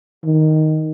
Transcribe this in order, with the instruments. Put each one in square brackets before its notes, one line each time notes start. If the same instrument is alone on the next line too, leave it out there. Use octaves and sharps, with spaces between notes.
[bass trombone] D#3